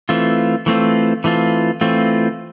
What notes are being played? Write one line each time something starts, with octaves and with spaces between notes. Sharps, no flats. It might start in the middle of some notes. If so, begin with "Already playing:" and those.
E3 A3 C4 F4
E3 A3 C4 F4
E3 A3 C4 F4
E3 A3 C4 F4